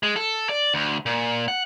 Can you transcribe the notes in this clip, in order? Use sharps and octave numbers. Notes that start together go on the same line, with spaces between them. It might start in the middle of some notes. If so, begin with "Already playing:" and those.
G#3
A4
D5
D2
A#2
F#5